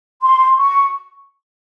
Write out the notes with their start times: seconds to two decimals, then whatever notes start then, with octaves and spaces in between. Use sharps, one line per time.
0.22 C6
0.58 C#6